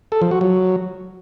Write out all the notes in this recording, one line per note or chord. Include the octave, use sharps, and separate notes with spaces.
A4
F3
F#4
F#3